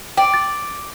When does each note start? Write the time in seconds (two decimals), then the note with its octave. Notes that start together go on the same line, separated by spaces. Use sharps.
0.17 D5 G5
0.34 A6